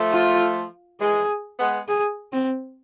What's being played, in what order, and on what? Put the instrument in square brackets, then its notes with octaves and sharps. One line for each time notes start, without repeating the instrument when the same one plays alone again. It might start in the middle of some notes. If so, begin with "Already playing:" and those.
Already playing: [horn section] F3 A3
[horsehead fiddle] F4
[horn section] E3 G#3 [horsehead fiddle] G#4
[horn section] G#3 B3
[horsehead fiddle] G#4
C4